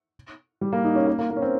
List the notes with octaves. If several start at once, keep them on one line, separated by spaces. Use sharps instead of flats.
G3
A#3
D#4
C#4
A#3
A#3
A#3
C#4
C4